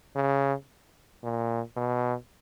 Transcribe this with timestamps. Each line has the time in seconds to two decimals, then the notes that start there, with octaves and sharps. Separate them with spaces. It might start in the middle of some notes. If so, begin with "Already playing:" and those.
0.16 C#3
1.23 A#2
1.76 B2